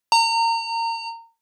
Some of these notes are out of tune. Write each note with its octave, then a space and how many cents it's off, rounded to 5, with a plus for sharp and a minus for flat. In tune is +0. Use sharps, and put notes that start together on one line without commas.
A#5 -30